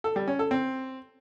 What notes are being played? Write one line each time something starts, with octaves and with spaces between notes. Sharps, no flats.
A4
G3
C#4
A4
C4